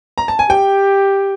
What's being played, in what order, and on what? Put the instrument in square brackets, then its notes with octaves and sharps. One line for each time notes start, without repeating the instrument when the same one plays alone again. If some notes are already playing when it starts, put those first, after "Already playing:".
[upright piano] A#5
A5
G#5
[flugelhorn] G4 [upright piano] G5